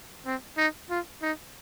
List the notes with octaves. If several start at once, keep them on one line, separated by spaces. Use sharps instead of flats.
C4
D#4
F4
D#4